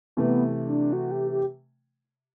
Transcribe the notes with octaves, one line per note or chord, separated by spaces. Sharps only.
C3 E3 A3 B3
D4
F#4
G4
G4